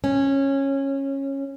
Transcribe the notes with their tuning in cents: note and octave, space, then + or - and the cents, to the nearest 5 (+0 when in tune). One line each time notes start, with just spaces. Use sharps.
C#4 -15